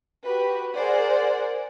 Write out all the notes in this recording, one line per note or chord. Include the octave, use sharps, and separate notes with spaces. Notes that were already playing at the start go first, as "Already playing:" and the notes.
F#4 G4 B4
G#4 A#4 C5 D5 F#5